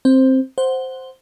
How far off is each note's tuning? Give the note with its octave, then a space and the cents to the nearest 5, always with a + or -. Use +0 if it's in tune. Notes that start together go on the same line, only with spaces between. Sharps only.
C4 +10 C5 +0
C5 +0 F#5 +0